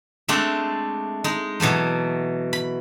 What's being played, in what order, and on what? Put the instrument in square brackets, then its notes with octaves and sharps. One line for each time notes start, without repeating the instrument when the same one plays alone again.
[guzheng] G#3 A3 C4 D4
G#3 D#4
B2 E3 F#3 A3
B5